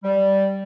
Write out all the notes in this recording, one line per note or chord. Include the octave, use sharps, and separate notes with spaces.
G3